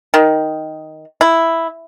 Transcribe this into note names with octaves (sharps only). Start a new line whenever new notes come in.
D#3
E4